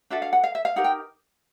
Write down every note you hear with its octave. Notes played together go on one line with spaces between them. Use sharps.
D4 F#4 A4 E5
F5
F#5
F5
E5
F5
D#4 G4 A#4 F#5
G5